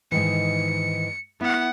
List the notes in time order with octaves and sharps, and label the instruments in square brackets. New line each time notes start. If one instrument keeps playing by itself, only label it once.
[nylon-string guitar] G#2 D#3 E3 [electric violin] C#7
[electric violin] B3 F#5 [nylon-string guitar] E4